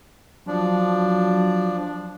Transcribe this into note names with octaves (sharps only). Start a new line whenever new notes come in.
F3 F#3 D4